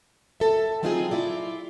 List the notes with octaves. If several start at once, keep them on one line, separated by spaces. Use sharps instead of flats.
A4 E5
F#3 C4 D#4 F4 G4 G#4
E4 F4 D5